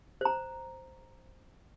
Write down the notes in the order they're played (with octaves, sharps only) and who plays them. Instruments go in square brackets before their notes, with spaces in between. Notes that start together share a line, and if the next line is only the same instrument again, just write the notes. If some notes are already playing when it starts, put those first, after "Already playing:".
[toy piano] C5 A#5